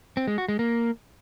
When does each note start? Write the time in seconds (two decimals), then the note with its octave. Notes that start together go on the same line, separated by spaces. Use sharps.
0.17 C4
0.27 G#3
0.38 F#4
0.48 G#3
0.59 A#3